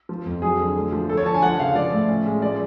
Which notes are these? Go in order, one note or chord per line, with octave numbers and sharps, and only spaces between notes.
F3
F2
F#3 G#4
D3
A3
F3
F3 A4
C#5
D3 A5
G#5
F3 F#5
C#3 F5
F3 D5
A2
C#4
G#3
F3 D5